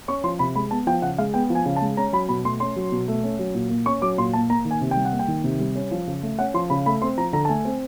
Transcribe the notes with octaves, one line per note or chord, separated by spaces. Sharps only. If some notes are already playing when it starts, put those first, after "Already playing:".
C#4 C#6
F3 C6
C3 B5
G#3 B5
B3 A5
F3 G5
C#3 F#5
G#3 F5
B3 G5
F3
G#5
C#3
A5
G#3
C#4 A#5
F#3 B5
B2 B5
A3 C6
C#4 C6
F#3
B2
A3
C#4
F#3
A#2
A#3
C#4 C#6
F#3 D6
A#2 C6
A#3 A5
A#3 A#5
D#3
G#5
C3
G5
G3
F#5
A#3
G5
D#3
C3
G3
C#4
F3
C#3
A3
C#4 F#5
F3 C6
C#3 B5
A3 B5
C4 C6
F3 A#5
D3 A#5
A5
A3 G#5
C4